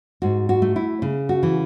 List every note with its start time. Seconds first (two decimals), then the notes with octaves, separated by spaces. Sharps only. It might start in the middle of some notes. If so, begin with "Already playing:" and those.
0.22 G#2 F#4
0.49 F#4
0.62 A3
0.76 E4
1.02 C#3
1.29 F#4
1.43 E3